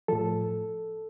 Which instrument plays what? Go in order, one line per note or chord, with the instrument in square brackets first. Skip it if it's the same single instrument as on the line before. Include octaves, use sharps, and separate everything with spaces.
[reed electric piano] A2 F3 A4